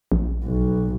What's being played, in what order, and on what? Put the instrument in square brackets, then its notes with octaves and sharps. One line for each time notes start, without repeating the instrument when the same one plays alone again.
[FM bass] A#1
[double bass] B1